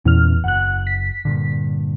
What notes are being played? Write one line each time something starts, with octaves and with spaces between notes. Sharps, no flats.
E2 A#2 C#4 F6
F#1 F#5 F#6
B6
G2 A#2 D3